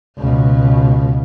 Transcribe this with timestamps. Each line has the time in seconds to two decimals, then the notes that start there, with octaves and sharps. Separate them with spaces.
0.18 C#2 B2